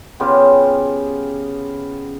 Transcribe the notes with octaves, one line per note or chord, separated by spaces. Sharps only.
C#3 B3 F4 G4